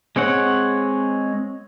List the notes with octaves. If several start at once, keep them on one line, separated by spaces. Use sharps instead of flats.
G#3 C4 C#5 F#5